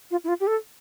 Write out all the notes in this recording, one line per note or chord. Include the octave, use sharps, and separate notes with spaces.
F4
E4
F4
G4
A4